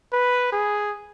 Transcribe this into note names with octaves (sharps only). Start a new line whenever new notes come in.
B4
G#4